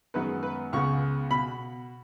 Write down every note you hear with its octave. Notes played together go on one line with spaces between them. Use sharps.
F#2 D#3 G#3 B3 B4
B4
C#2 C#3 B3 C#6
B2 B5